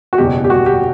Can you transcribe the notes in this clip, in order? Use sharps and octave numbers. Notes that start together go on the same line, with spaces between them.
F#4
F#1 E2 B2 G4
G4
F#4
G4